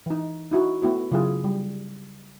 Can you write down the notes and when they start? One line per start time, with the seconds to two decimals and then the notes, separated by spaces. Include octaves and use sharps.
0.06 E3 D#4
0.51 D#4 E4 F#4
0.82 A3 B3 E4 F#4
1.11 C#3 F#3 E4 F4 G#4
1.44 G3